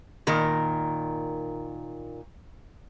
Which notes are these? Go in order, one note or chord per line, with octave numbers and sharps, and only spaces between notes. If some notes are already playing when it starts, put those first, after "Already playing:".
A#2 D#3 A#4